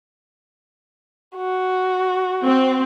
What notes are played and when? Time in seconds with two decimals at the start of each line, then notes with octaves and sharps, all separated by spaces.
1.36 F#4
2.44 C4